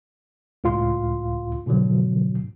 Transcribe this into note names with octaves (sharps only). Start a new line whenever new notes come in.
C#2 A2 F4 F5 C6
G#2 B2 D3 F3 F#3